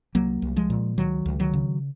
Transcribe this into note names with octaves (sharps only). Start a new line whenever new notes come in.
C2 F#3 A#3
C2
F3 G#3
A#2
C#2 D#3 F#3
C#2
D#3 F#3
C#3